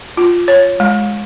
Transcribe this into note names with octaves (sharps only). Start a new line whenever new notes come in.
F4
C#5
G#3